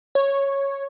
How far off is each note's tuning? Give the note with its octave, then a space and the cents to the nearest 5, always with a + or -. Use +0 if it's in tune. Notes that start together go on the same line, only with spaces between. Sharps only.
C#5 -5